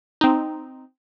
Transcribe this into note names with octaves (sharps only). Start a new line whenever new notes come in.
C4 D#4